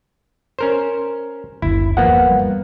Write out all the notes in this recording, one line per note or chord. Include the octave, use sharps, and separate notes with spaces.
C#4 A#4 C5
F#1 D2 E4
G1 E2 F3 A#3 B3 F#5
G3